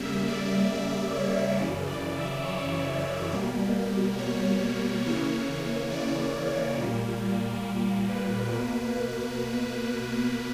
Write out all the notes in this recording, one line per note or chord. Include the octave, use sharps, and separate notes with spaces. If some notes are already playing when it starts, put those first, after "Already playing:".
Already playing: C#3 G3 A#3 E5
D5
E5
C#5
F#2 C#3 E3 D5
D5
E5
C#5
B2 G3 A#3
C#5
C#3 E3 A#3 C#5
D5
A#2 G3 A#3
B4
B2 A#3